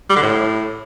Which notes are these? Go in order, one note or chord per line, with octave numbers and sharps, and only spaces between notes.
G3
D3
A2